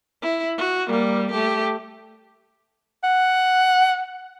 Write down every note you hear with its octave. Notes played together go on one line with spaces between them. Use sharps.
E4
F#4
G3 A#3
A3 G4
F#5